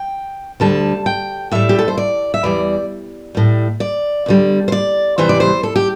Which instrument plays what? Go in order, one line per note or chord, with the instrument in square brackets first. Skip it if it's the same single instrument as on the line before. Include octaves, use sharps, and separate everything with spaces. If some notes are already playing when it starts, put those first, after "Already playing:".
Already playing: [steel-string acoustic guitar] G5
D2 D3 G3 A5
G5
A2 G3 E5
G4
A4
C5
D5
E5
E2 E3 G3 D5
A2 G3
D5
E2 D3 G3
C5
D5
E2 C3 E3 G3 C5
D5
C5
A4
G4